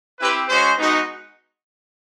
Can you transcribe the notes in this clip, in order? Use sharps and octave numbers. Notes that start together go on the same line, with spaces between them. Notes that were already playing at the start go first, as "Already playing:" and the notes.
C4 E4 G4 B4
G#3 C#4 F#4 C5
G#3 B3 D#4 F#4